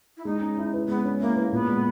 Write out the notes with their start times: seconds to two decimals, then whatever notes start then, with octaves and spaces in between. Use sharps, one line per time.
0.17 E4
0.25 G#3 D#4
0.41 C#4
0.58 E4
0.74 B4
0.88 G#3 B3
1.05 C#4
1.21 A#3 E4
1.36 B4
1.52 A#2 B3
1.68 G#3